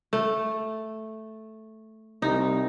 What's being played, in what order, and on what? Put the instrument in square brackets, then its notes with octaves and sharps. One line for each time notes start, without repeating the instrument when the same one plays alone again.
[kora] A3
[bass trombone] C2 [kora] D#4